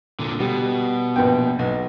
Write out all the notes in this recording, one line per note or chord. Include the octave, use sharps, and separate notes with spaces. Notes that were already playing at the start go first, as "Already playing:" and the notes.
A#2 D3
B2 G3
A#1 B3 G5
B1